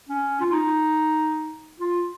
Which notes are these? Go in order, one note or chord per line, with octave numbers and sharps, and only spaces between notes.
C#4
F4
D#4
F4